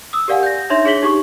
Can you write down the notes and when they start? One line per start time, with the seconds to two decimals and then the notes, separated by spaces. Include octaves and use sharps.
0.13 D#6 E6
0.28 G4 A#4 D5 F5 F#5 G#5
0.43 G6 A#6
0.70 D4 D#4 C#5 E5 C6 A#6
0.85 D4 G#4 C#5 B6 F#7 G7
1.02 D#4 G4 C#6 D6